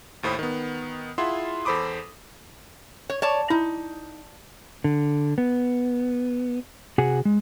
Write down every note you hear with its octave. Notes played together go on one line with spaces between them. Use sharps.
D#2 A2 C5 B5 D#6
D#3 B3
E4 F4 G#4 E5 F#5 C6
E2 A4 C5 B5 D6 D#6
C#5
C#5 D5 A5
D#4 E4
D3
B3
C3 F#4 G#4 F#5 G#5
G#3